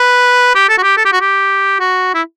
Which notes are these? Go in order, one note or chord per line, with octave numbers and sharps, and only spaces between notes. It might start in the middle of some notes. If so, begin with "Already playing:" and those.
Already playing: B4
G4
A4
F#4
G4
A4
G4
F#4
G4
F#4
E4